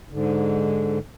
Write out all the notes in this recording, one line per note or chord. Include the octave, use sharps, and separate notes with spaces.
G#2 D3